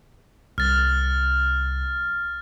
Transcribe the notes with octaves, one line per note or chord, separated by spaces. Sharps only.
C2 F6 A6